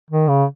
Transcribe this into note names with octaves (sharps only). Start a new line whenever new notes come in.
D#3
C#3